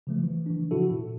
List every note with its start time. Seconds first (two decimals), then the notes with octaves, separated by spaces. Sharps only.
0.07 C#3 F3 A3
0.23 E3
0.46 E3 D4
0.71 A#2 C#3 F3 E4 F#4 A4
0.91 A#2